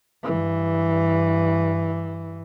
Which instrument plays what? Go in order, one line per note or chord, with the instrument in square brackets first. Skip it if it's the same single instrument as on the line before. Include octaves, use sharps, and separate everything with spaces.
[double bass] G2 E3